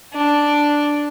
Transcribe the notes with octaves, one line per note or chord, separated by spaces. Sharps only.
D4